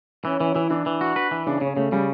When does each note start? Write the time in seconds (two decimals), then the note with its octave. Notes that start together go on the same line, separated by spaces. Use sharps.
0.25 E3 C#4
0.40 E3 C#4
0.55 E3 E4
0.70 E3 D4
0.86 E3
1.01 F#4
1.16 B4
1.31 E3
1.47 C#3 D4
1.57 C#4
1.61 C#3
1.67 C#4
1.77 C#3 A3
1.92 C#3 G3